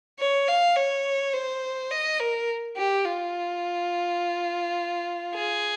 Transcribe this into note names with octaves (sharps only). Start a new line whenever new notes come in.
C#5
F5
C#5
C5
D#5
A#4
G4
F4
G#4